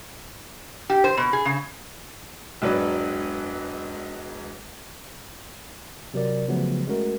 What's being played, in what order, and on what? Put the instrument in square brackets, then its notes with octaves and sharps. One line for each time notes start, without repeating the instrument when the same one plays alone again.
[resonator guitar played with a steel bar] G4
C5
B2
G#4
C#3
[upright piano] E1 G#2 F#3 D4 B4
[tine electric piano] C3 F#3 A#4 D5
C#3 F3 F#3 A3 B3
G#3 A3 C#4 F#4 A#4